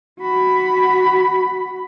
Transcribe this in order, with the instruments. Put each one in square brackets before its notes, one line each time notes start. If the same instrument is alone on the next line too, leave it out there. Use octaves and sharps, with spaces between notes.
[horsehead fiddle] F#4 B5